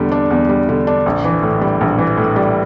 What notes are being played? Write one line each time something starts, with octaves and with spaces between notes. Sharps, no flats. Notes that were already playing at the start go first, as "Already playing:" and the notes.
Already playing: E2 D3 G3
D4
E2
G3
D3
D4
A#1
E3
A2
G3
A#1
E3
A2
G3